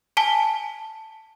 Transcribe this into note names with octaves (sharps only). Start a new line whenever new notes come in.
G#5 A5 B6 G7